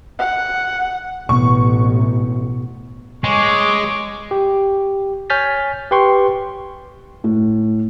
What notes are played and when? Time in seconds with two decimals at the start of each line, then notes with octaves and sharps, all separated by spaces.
0.19 F#5
1.29 A1 B2 B3 C#6
3.24 G#3 C#5 D6
4.31 G4
5.30 C#5 G#5 F6 G6 A6 B6
5.91 G4 B4 G5 C6 C#6
7.24 A2